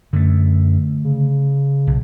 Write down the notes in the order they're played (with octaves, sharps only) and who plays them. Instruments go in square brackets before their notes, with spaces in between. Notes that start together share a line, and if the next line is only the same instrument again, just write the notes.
[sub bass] F#2 [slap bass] D3 A3
[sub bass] C#3
[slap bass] B1